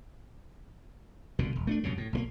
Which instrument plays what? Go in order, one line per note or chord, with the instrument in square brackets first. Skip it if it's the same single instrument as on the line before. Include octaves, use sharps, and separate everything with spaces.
[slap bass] C2 B2 D3
E1
A3 C#4 D4
C2 F#2 A#2 C#3
A2
B1 G3 A#3